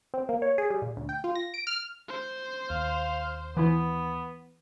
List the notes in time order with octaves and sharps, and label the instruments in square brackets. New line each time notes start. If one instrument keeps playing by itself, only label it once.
[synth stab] C4
A#3
C#5
G#4
G3
A#2
D2
G5
F4
A#6
D7
F6
[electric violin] C5
[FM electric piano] D#2 [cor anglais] F5
[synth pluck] E3 E4 [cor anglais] B3